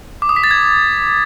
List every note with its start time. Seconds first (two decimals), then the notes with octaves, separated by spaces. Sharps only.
0.22 D6
0.29 D#6
0.36 B6
0.44 A6
0.51 G#6